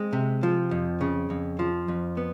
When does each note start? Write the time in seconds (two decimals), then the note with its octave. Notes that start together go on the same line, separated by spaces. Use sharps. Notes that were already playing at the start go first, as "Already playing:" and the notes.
Already playing: G#3 C4
0.13 C3
0.43 F3
0.71 F2
1.01 C#3
1.30 F2
1.59 F3
1.88 F2
2.17 B3